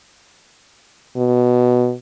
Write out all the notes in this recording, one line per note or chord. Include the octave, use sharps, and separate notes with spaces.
B2